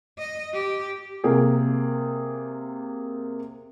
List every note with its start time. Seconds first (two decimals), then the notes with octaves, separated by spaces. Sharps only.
0.19 D#5
0.54 G4
1.24 C3 A#3 G#4